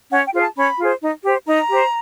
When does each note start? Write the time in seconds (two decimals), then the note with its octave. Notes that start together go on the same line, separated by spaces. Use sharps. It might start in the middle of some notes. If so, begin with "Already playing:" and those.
0.11 C#4 F#5
0.27 G5
0.34 F4 G#4 C5
0.41 A5
0.56 C#4 B5
0.79 F4 G#4 C5
1.01 D#4
1.24 G4 C5
1.47 D#4 A#5
1.70 G4 C5